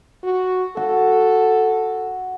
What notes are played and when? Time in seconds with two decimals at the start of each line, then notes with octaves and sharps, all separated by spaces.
0.24 F#4
0.77 F#4 A4